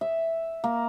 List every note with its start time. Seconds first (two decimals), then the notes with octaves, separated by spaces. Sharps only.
0.01 E5
0.64 A#3